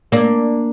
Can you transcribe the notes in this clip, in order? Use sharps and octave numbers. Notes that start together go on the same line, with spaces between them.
A#3 D4